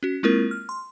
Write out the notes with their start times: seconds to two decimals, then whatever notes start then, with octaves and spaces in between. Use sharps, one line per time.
0.03 C#4 F#4
0.23 G#3 A#3 C4 E4 F4 A#4
0.51 F6
0.69 C6